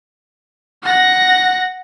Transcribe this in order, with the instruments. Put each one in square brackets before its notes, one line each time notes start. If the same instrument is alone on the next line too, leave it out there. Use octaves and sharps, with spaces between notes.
[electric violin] F#5 A#6